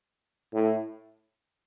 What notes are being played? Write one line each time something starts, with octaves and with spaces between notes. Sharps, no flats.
A2